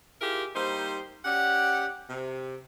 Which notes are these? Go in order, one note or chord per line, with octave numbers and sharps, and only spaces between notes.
E4 F4 G4 G#4 A#4
G3 A#3 D#4 C5
C#4 G4 D5 F#5
C3